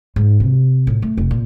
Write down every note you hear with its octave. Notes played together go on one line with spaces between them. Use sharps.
G#2
C3
A2
A3
F1
A#2